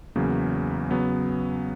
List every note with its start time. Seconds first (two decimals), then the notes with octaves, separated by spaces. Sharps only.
0.16 E2 C#3 F#3 A#3
0.91 C#3 F#3 B3